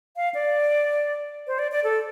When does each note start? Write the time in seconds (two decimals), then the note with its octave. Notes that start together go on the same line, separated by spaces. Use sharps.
0.16 F5
0.35 D5
1.47 C5
1.59 D5
1.72 D5
1.84 A4